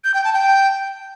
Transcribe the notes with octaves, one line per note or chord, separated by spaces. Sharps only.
G6
G5
A5
G5